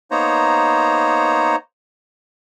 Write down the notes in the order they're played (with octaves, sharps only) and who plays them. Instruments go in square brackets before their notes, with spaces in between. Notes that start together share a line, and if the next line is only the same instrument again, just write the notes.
[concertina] A#3 B3 D#4 C5 C#5 A#5